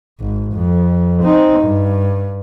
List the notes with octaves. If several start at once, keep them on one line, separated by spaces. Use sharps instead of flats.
G#1
F2
C4 D#4
G2